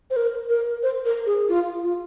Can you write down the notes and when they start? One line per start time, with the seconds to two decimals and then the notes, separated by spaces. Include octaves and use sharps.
0.10 C5
0.16 A#4
0.49 A#4
0.83 C5
1.05 A#4
1.26 G#4
1.49 F4
1.82 F4